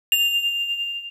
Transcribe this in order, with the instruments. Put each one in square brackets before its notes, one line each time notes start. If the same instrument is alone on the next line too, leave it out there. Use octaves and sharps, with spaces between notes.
[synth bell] F7